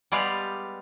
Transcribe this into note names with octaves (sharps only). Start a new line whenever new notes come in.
G3 G#3 B3 G4 D5 F5